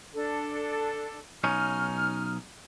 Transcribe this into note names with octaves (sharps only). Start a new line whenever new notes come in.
D4 A4
B1 C#4 D#4 F6